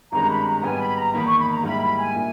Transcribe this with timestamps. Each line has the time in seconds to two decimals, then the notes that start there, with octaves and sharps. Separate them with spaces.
0.12 G#1 G2 D#3 G#3 C#4 A#5
0.30 B5
0.46 A#5
0.63 G#2 G3 B3 G#5
0.80 B5
0.97 A#5
1.13 E2 D#3 A#3 D#4 B5
1.26 C#6
1.38 B5
1.51 A#5
1.63 G#2 G3 A#3 E4 B5
1.81 B5
1.98 G#5
2.15 A#2 A#3 E4